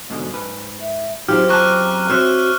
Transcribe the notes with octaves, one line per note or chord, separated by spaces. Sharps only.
G#2 B2 D3
G#2 B4
E5
F#3 C4 D#4 F4 G4 F6
F#2 A5 A#5 C#6 D6 F#6
C4 F#4 C5 C#5 E5 C6 F6 F#6